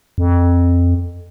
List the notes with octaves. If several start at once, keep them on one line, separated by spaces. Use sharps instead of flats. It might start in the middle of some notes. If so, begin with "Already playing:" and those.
F2